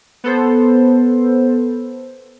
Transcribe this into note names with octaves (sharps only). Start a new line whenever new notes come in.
B3 A4 C5